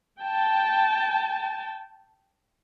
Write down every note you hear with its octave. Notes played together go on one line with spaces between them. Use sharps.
G5 A5